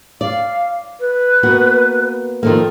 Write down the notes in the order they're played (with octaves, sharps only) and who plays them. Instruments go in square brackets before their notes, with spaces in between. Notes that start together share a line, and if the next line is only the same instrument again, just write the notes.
[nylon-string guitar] D5 [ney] F5
[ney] B4
[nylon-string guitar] A#3 B3 F#4
[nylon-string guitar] D#3 F3 A#3 [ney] A4